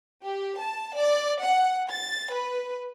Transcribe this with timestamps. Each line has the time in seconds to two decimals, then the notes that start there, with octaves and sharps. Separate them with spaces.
0.23 G4
0.58 A5
0.95 D5
1.43 F#5
1.90 A6
2.32 B4